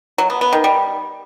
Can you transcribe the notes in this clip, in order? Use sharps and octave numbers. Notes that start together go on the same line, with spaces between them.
F#3
B3
B3
D#3
G3